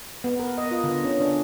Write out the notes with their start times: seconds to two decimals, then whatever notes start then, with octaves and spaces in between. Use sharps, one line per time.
0.24 B3
0.40 A#4
0.58 D#5
0.71 F4
0.84 D3
1.04 C#4
1.21 D4